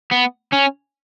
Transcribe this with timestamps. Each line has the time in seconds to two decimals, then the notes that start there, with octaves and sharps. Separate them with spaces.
0.11 B3
0.52 C#4